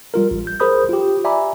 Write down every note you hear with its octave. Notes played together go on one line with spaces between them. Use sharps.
G3 F4 A#4
A1
G6
G#4 A#4 C5 B5 D#6 G6
F4 G4
D5 E5 G#5 A#5 B5 D6